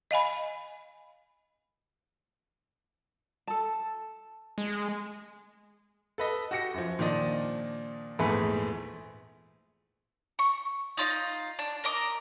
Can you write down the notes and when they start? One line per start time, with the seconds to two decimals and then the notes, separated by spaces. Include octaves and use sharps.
0.11 D#5 F5 G#5 B5
3.47 A4 A5
4.58 G#3
6.18 A4 B4 D#5
6.51 F#4 G4 A#6 C#7
6.74 F#2 F3
6.99 A#2 D#3 F3 D4 D#5 D#7
8.19 A#1 E2 G#2 A3 G#4 B4
10.39 C#6
10.97 D#4 F4 D5 D#5
11.59 D4
11.84 A#4 D#5 D6